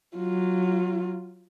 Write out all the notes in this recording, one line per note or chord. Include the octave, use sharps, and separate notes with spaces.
F#3 F4